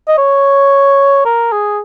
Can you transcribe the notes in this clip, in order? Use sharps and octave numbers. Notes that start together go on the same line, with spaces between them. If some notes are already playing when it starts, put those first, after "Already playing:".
D#5
C#5
A#4
G#4